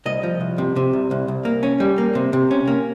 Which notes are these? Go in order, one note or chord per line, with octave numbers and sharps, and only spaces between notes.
C2 D#5
F3
C2
C3
C3
C2
C2
C2
A#3
C#4
G3
A#3
C3
C3
C#4
A#3